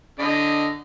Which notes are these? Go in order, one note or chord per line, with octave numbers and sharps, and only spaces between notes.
D3 D#5